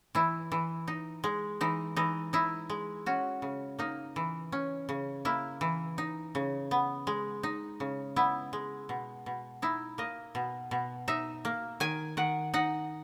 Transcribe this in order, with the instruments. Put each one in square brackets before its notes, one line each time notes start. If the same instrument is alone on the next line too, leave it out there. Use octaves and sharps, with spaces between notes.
[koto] E3 E4
E3
D#4
G#3
E3 D#4
E3 D#4
D#4 E4
G#3
C#4 F#4
C#3
A#3 D#4
E3
C#4
C#3
A#3 E4
E3
D#4
C#3
B3
G#3
D#4
C#3
B3 E4
G#3
B2
B2
D#4 E4
A#3 D#5
B2
B2
D#4 E5
A#3
D#3 G#5
D#3 F#5
D#4 F#5